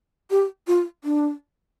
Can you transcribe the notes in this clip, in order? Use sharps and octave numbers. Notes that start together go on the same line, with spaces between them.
G4
F4
D4